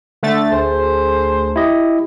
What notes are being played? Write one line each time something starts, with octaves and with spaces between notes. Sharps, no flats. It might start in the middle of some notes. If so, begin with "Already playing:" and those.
D3 A3 A6
D2 G#4 A4 C5
E4 G4 D#5